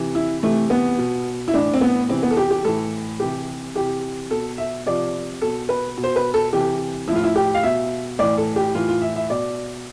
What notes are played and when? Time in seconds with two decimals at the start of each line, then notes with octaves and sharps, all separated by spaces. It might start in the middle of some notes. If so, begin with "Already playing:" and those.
Already playing: C3 E3
0.15 E4
0.43 C3 E3 A3
0.70 B3
0.98 B2
1.48 E4
1.54 A2 E3 D4
1.74 C4
1.81 B3
2.09 C3 E3 C4
2.23 B3
2.31 A4
2.37 G4
2.51 G4
2.65 A2 E3 A4
3.20 C3 E3 G4
3.75 C3 E3 G4
4.30 B2 A4
4.58 E5
4.86 C3 F3 D5
5.42 B2 A4
5.69 B4
5.97 B2
6.04 C5
6.16 B4
6.34 A4
6.53 C3 E3 G4
7.07 F3 E4
7.12 A2 F4
7.23 E4
7.36 G4
7.55 F5
7.63 B2 E5
8.19 A2 E3 D5
8.38 A4
8.56 G4
8.75 A2 E3 F4
8.88 F4
9.02 E5
9.16 E5
9.30 B2 D5